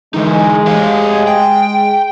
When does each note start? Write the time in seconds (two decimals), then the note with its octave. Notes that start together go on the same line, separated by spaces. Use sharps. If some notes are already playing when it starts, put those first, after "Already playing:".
0.14 E3 G#3 D#4
0.67 G4 C5 F5
1.27 G5